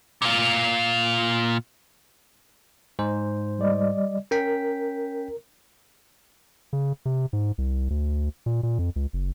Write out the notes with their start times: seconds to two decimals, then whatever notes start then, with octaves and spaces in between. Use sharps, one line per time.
0.22 A#2 F4
2.99 G#2 C5
3.59 G3 D5 D#5
4.31 C#4 A#4 G5 B6
6.73 C#3
7.05 C3
7.33 G#2
7.58 C2
7.90 D2
8.46 A#2
8.63 A#2
8.79 F2
8.96 C#2
9.13 F#1